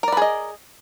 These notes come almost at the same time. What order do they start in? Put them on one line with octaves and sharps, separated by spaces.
A#4 D5 B4 G#4 D#5